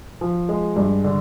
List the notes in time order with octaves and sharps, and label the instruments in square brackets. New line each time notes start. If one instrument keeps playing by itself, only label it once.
[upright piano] F3
G#3
G2
D3